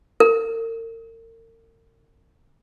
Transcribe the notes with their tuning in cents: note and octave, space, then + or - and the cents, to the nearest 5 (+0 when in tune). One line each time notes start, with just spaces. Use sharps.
A#4 -40